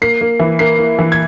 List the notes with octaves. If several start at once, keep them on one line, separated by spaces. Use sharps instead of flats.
A#3 C7
A#3
E3
A#3 C7
A#3
E3
G#6